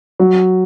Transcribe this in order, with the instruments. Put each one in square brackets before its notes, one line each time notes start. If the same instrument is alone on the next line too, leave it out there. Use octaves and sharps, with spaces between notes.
[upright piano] F#3